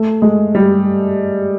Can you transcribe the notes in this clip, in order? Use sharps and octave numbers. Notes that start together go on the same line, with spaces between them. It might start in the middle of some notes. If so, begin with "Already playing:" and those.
Already playing: A3
G#3
G3